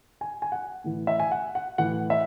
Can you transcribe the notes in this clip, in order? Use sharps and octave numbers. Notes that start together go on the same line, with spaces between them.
G#5
G#5
F#5
A2 E3
E5
G#5
F#5
F#5
A2 E3 F#5
E5